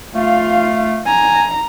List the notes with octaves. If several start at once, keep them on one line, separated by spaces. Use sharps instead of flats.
A3 F4 F5
G#5 A#5